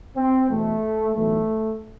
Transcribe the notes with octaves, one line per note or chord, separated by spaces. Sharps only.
C4
E2 B2 A3
B1 A2 E3 A3